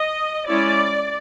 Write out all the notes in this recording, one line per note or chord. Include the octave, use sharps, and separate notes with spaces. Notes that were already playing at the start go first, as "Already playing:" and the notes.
Already playing: D#5
G#3 C#4 E4 D5